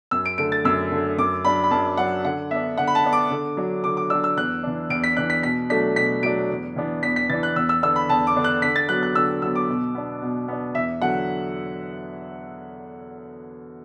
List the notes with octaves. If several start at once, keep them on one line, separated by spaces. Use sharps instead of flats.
F#2 E6
D7
D3 A3 D7
A6
F#2 E6
D3 A3
F#2 D6
F#3 D4 B5
B5
F#2 A5
F#3 D4 F#5
D3 F#5
B3 D4 E5
D3 F#5
B5
A5
B3 D4
D6
D3
F#3 D4
D3 D6
D6
F#3 D4 E6
E6
E2 F#6
E3 D4
E2 D7
B6
E3 D4 F#6
B6
B2 B6
F#3 A3 D4 B6
B2 B6
F#3 A3 D4 D7
E2
E3 B3 D4
E2 B6
B6
E3 B3 D4 A6
F#6
E2 E6
E6
D3 B3 D4 E6
B5
E2 A5
D6
D3 B3 D4
F#6
D3 B6
A6
F#3 B3 F#6
F#6
D3 E6
F#3 B3 E6
D6
B2
B3 D4
B2
B3 D4
E2 E5
D3 F#3 F#5